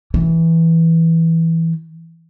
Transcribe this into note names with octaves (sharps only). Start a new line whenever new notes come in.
E3